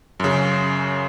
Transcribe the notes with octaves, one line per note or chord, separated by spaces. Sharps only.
F#2 C#3